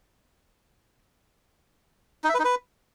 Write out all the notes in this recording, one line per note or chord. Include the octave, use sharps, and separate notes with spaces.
D#4
E5
B4
D#4
B4